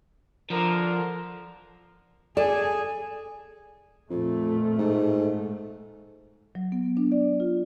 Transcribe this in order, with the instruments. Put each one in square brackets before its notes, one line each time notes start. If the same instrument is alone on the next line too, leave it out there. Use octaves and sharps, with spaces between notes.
[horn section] D3 A#4 [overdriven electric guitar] F3
[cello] G#4 [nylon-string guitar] A4 [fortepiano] D5
[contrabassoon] F2 [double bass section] A#2 A3
[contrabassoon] G#2
[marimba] F#3
B3
D4
D5
F4